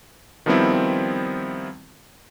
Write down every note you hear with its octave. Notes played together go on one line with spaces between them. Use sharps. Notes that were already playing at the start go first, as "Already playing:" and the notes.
D#3 F3 G3 B3 C4 E4